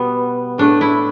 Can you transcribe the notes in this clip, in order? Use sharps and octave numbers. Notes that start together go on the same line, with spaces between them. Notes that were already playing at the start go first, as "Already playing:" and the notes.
Already playing: B2 G3 B3
A2 A3 D4
E4